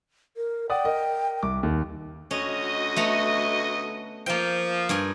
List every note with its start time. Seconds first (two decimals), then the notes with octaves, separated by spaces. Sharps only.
0.37 A#4
0.70 D5 F#5 G5 D#6
0.85 A#4 D#5
1.43 C2 D6
1.63 D#2
2.31 D2 C#4 F#4 D#5
2.96 A3 B3 A#5
4.26 F3 A#3 G5
4.89 G2 A#4 G#5